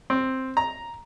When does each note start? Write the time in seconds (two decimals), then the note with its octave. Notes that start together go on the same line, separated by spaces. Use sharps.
0.10 C4
0.57 A#5